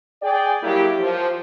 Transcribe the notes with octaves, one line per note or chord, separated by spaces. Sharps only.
G#4 D5 G5
F#3 G3 A#3 E4 G4
F3